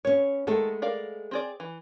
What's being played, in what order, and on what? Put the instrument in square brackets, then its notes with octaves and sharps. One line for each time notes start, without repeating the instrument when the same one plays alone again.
[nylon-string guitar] B3 C#4 [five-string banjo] C#5
[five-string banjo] D#3 A4 [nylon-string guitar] G#3 A3 B3
[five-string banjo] A#4 D5 F5
C4 G#4 D5
E3